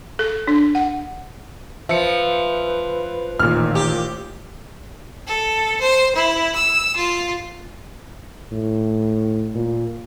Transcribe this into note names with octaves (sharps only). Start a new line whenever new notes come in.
A4
D4
F#5
F3 B4 E5 C#7
A1 A#2 D#3 F6
G4
A4
C5
E4
E6
F4
A2
A#2